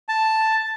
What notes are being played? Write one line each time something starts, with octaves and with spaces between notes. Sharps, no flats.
A5